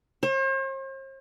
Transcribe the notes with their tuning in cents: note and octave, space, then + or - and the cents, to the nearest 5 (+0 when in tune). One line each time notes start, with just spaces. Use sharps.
C5 +45